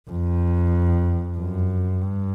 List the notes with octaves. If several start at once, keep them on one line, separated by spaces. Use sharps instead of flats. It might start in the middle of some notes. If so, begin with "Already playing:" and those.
F2
F#2
G2